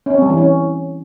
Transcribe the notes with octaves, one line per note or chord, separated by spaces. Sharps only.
C#4
C4
G3
E3
C#4